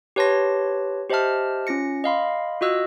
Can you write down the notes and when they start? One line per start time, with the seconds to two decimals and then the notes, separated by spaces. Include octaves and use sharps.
0.16 G4 B4 C#5 A5 C6 A#6
1.10 G4 C5 D#5 E5 A5 F6
1.67 C#4 F4 A#6 C#7
2.04 D#5 F5 B5 C6
2.61 F4 F#4 D#5 E6 F#6